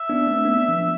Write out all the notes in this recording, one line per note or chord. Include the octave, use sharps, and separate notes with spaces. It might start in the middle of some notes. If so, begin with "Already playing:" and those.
Already playing: E5
B3 D4
A3 C4
B3 D4
F3